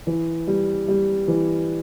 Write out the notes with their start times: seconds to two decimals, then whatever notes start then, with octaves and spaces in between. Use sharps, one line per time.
0.07 E3
0.47 G3
0.88 G3
1.28 E3